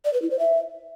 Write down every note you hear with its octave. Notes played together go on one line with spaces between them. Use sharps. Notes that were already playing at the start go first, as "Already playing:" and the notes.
D5
B4
E4
C5
E5